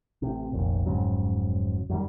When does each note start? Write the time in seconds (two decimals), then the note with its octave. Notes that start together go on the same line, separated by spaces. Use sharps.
0.22 A1 C3
0.53 F1 A#1 D#2
0.86 F1 G#2 C#3 F#3
1.90 F#2 D#3 G3